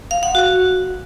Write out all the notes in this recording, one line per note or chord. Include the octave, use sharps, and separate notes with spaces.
F5
F#5
F#4